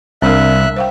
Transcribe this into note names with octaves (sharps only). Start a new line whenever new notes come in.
C2 C4 D4 A#4 E5 F5 F#6
C5 F5 G5